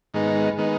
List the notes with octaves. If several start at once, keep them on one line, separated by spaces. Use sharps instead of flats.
G#2 D#3 G#3 B3 D#4
D#3 G#3 B3 D#4